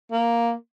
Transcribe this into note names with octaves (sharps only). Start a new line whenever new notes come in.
A#3